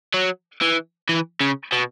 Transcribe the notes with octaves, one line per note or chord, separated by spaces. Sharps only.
F#3
E3
E3
C#3
B2